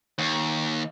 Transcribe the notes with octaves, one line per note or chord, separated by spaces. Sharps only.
D#2